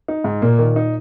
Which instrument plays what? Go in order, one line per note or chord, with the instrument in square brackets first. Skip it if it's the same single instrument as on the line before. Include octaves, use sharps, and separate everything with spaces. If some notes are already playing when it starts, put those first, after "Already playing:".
[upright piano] D#4
G#2
[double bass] A#2 [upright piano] A#3
[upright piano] D#3
D#4